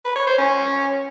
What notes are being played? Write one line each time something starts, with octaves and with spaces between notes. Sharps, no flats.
B4
C#5
C5
C#4